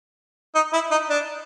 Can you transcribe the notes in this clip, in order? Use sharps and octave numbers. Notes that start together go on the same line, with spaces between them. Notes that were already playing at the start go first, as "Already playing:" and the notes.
D#4
E4
D#4
D4